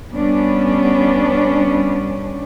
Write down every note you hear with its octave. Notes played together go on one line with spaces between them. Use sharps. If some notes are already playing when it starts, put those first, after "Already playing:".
G3 B3 C#4 D4